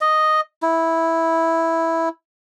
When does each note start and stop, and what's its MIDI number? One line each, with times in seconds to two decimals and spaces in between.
0.01 0.41 75
0.62 2.09 64